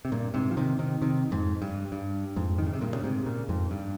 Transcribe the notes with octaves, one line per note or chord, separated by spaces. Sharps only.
C3
G2 A#2
G#2 C3
F3
C3 D#3
C3 D#3
C3 D#3
F2 G#2
G2
G2
F2 G#2
D#3
C#3
C3
G2 A#2
C#3
G#2 C3
A#2 C#3
F2 G#2
G2